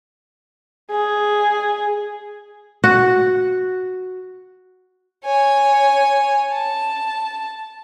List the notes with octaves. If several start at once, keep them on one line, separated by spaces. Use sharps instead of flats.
G#4
F#4
C#5 G#5
A5